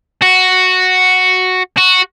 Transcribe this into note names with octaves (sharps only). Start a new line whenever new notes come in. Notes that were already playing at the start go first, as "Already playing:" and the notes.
F#4
F#4